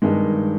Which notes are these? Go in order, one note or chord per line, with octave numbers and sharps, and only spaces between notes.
G2 D#3 G#3